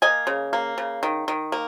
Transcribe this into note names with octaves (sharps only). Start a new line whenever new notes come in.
A#3 D#5 G#5
C#3
A#3
C#3
D#3
D#3
A#3